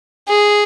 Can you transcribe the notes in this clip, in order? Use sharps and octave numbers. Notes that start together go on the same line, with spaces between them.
G#4